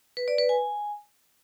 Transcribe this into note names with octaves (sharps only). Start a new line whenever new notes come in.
B4
D5
B4
G#5